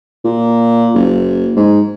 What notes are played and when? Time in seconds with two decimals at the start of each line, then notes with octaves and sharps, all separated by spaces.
0.25 A#2
0.95 F#1
1.56 G#2